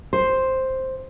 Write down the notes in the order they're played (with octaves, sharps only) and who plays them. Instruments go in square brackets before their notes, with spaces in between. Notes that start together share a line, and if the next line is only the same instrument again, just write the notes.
[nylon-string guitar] C5